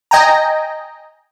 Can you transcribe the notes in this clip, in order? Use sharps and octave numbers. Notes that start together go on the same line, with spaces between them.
D#5 G5 G#5 A#5